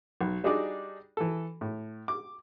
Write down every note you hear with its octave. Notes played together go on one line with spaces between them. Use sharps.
B1
G3 D4 D#4 F#4 G#4 D5
E3 A4
A2
D6